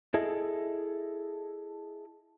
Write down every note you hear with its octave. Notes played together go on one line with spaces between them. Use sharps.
E4 G#4 A4 D#5 E5